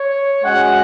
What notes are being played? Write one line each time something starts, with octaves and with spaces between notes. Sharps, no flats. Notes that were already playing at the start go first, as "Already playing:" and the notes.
Already playing: C#5
G#3 C#4 F#4 F#5